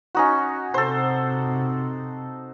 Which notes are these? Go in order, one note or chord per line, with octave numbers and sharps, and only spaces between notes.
C#4 D#4 F#4
C3 A4 C5